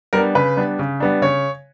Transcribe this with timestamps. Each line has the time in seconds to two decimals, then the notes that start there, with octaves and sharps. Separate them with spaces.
0.13 G3 B3 D4 A#4
0.35 C#3 B4
0.57 G3 B3 D4
0.79 C#3
1.00 G3 B3 D4
1.22 C#3 C#5